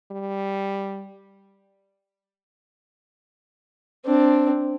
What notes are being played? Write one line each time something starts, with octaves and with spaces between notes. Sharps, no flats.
G3
C4 D4